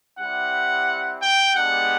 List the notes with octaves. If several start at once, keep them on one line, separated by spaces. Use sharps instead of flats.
G3 C4 E4 G4 F#5
G5
G#3 B3 D4 G4 F#5